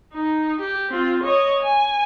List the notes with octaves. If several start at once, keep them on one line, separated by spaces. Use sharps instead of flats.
D#4
G4
C4 F4
C#5 D#5
G#5